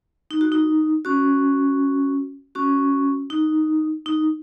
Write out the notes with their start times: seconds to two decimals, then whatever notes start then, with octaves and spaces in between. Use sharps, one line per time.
0.31 D#4
0.41 F#4
0.52 D#4
1.05 C#4 F#4
2.55 C#4 F#4
3.30 D#4
4.06 D#4